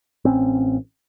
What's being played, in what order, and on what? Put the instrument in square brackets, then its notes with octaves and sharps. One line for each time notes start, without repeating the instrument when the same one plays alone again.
[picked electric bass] A1 C4 C#4